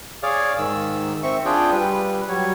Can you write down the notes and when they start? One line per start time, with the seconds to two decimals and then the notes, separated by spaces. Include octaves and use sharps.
0.23 G#4 C#5 D5 F5
0.58 G#2 D#3 E6
1.23 C4 E5 C#6
1.45 D4 F4 G#4 G5
1.71 G3 B4
2.29 F#3 G3 C#5